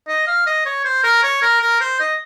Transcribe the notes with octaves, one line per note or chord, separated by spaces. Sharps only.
D#5
F5
D#5
C#5
C5
A#4
C#5
A#4
A#4
C5
D#5